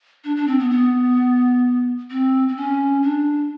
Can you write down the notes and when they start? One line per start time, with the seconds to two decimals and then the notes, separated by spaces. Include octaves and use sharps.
0.24 D4
0.36 D4
0.47 C4
0.59 B3
0.70 B3
2.10 C4
2.48 C4
2.56 C#4
3.03 D4